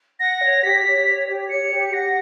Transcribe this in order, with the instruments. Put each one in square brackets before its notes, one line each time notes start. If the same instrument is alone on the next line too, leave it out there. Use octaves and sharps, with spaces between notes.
[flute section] F#5 [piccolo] A#6
[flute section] C#5
[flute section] G4 [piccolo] B6
[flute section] C#5
C#5
G4
[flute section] C#5 [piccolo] C#7
[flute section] G4
[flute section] F#5 [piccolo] A#6